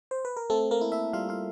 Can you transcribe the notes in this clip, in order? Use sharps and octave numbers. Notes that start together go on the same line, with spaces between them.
C5
B4
A#4
A3 C4 A4
A#3 A#4
E4
E4 E5
G3 F4 F5
F4 F5